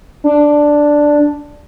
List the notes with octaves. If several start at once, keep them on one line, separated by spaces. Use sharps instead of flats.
D4